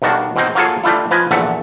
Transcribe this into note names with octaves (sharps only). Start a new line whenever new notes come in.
B1 G2 D#3 D4 F#4
B2 G#3 C4 D#4
F#3 A#3 F4 G#4 A4
G3 A3 D4 E4 F4
F3 B4 D#5 G#5
A#1 E2 A#2 F#4 A4 E5